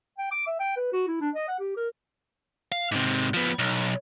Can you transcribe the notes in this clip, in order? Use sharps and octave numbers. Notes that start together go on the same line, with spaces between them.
G5
D6
E5
G5
B4
F#4
E4
D4
D#5
F#5
G4
A#4
F5
G#2 C3
F3 B3
B1